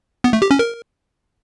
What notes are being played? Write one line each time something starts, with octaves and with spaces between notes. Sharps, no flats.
B3
A3
G4
C#4
A#4